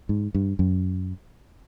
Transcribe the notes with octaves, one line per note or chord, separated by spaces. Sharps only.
G#2
G2
F#2